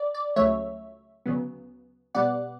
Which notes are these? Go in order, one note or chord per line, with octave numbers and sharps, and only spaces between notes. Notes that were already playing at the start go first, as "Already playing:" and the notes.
Already playing: D5
D5
C#2 C#3 F#3 A3 C#5 E5
D2 C#3 F#3 B3
B2 G3 B3 D5 F#5